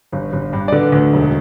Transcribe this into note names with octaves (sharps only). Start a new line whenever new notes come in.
G1
G1
G2
D5
D3 B4
D2
E1